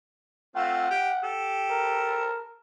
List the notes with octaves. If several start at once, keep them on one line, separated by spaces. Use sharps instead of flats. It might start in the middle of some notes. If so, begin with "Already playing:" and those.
A3 C4 F4 F#5
G4 G5
G4 A4
A#4